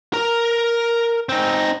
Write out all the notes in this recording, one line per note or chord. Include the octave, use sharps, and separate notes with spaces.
A#4 A#5
C4 D#4